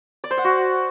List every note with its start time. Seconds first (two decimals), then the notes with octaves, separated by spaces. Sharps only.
0.24 D5
0.31 C5
0.37 F#5
0.44 F#4